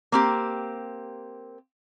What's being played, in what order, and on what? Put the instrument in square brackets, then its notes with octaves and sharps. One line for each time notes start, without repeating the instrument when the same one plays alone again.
[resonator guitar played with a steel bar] A#3 C4 G4